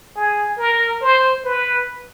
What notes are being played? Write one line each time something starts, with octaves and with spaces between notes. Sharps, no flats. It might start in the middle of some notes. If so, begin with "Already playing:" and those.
G#4
A#4
C5
B4